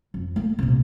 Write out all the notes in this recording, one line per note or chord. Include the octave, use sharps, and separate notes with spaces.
F2
A3 A#3
C2 A#2